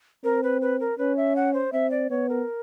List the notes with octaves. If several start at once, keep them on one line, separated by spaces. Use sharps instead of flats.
C4 A#4
B4
B4
A#4
C#4 B4
E5
F#5
C5
C4 E5
D5
B3 C#5
A#4